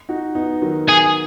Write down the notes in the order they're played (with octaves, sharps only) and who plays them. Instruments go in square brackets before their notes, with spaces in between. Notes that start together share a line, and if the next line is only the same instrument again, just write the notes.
[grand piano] D#4 F#4
B3 D#4
D#3 F#3
[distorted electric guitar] G#4